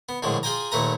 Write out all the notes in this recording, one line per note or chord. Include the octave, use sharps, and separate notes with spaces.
B3
A#1 A2 D3 G#3
F4 G#4 G5 G#5 A#5
D#2 A#2 A3 B4 A#5